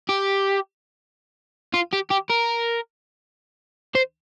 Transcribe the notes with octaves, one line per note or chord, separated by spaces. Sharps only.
G4
F4
G4
G4
A#4
C5